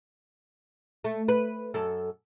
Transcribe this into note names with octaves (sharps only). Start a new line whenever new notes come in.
A3
B4
F#2 A4